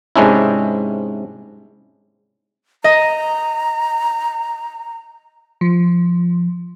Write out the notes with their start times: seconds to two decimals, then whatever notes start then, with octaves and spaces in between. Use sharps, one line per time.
0.16 G#2 C3 G#3 C#4 D4 E4
2.84 D#5 A#5
5.61 F3